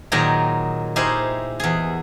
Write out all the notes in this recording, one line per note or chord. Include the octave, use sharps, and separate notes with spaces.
A#2 D#3 F#3 G#4 G5 A#5
D#4 E4 G4 G#4 A#4 C5
E2 G#4